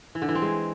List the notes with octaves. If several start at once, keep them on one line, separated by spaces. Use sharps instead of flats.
E3
D3
E3
C4
G#3